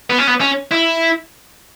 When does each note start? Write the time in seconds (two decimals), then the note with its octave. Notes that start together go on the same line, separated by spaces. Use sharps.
0.10 B3
0.18 C#4
0.27 B3
0.41 C#4
0.72 E4